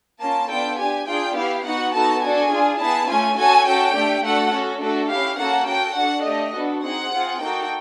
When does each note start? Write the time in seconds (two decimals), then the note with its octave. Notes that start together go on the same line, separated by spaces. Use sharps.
0.20 A#3 C#4 F4 A5
0.49 B3 D4 F4 A4 G5
0.78 D4 G4 G#5
1.07 D4 F4 G#4 G5
1.35 B3 E4 G4 F5
1.64 B3 D#4 F#4 F#5
1.93 B3 D#4 F#4 A4 A5
2.22 D4 F#4 A4 G#5
2.51 D4 F4 G#4
2.80 B3 E4 G#4 A5
3.08 A3 C#4 F4 G#5
3.37 C#4 F#4 A4 G#5
3.66 C#4 F#4 A4 G5
3.95 A3 D4 G4
4.23 A3 D4 F#4 A4 F#5
4.53 C#4 F#4 A4
4.81 A3 D4 F#4 A4
5.10 C#4 E4 G4 F5
5.39 A#3 C#4 F#4 A4 F#5
5.68 C#4 F#4 A4 G5
5.97 D4 F#4 A4 F#5
6.25 A3 D4 G4 D#5
6.54 B3 D4 F#4 A4
6.83 C4 D#4 G#4 F#5
7.12 C4 F4 G#4
7.41 A#3 D#4 F#4 A4 G5